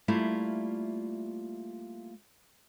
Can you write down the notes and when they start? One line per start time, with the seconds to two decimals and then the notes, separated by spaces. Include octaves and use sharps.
0.08 G3 A3 A#3 E4 F4